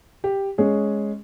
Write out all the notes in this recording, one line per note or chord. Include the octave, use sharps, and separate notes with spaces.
G4
G#3 C#4 G#4